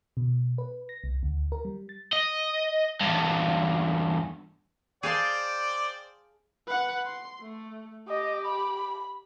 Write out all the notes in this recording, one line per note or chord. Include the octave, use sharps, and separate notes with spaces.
B2
B4
A#6
C2
D2
A#4
G3
A6
D#5
E2 G2
G#4 C5 D5 F5 G5 A5
B4 F#5
C6
A3
G4 D#5
B5